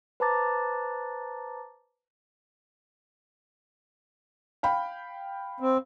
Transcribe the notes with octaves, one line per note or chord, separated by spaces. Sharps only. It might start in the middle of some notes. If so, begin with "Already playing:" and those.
B4 C5 A5 A#5 D6 A6
F5 G5 B5
C4